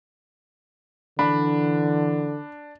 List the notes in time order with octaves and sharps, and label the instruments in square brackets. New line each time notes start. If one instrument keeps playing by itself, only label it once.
[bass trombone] D3 [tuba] E3 [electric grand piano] D4 [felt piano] B5